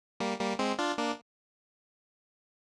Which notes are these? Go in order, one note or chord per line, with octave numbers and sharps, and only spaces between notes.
G3 A#3
G3 A#3
G#3 C4
D4 F4
A#3 D4